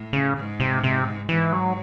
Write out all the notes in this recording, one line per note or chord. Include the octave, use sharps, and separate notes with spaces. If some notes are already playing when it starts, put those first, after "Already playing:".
Already playing: A2
C#3
G#2
C3
C3
G#2 E3
F#3